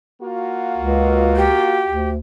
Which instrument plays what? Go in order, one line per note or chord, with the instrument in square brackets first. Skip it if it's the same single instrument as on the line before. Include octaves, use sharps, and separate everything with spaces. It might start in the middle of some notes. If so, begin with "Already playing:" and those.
[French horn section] A#3 F4 F#4
[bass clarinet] C#2
[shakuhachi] G4
[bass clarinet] D2